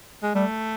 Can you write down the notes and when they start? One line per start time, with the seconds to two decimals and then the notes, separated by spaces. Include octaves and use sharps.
0.23 G#3
0.34 G3 A3